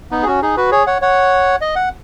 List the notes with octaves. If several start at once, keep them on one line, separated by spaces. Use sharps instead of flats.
B3 D#4
G#4
C#4 F#4
D#4 G#4
F#4 B4
G#4 C#5
C#5 F#5
C#5 F#5
D#5
F#5